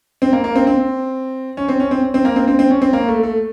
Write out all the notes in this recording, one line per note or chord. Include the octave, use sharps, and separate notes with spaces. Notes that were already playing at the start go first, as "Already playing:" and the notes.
C4
A#3
A#3
C4
C4
C#4
C4
C#4
C4
C4
A#3
C4
C4
C4
C#4
C4
A#3
A3
A3